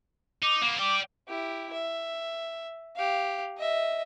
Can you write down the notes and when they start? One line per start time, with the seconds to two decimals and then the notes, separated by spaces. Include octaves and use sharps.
0.43 D#4 D6
0.62 A#3 B3
0.79 D5 G5 D6
1.28 E4 G4
1.73 E5
2.96 G4 F5
3.57 D#5 E5